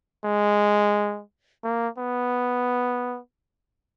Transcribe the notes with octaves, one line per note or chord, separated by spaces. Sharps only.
G#3
A#3
B3